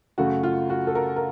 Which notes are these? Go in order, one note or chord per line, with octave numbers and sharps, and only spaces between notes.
F#2 C#3 A3 F#4
F4
F#4
A4
A#4
A#4